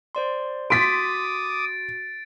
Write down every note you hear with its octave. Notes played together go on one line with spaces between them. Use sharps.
C5 D5 C6
F#4 C6 D6 D#6 A6 B6 D7